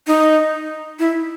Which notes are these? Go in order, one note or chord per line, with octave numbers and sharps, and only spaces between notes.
D#4
E4